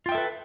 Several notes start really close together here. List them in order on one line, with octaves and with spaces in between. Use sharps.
F4 G5 E5 A4 B4